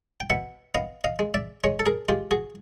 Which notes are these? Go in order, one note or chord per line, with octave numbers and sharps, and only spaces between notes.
G5
B2 E5 F#5
B3 D#5 F5
D#5 F5
G#3
D5 E5
G#3 C#5 D#5
A4
G#4 A#4
G#3 F4 G4
F#4 G#4